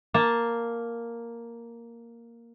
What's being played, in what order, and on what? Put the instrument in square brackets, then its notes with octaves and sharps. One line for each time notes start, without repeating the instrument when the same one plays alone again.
[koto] A#3 A5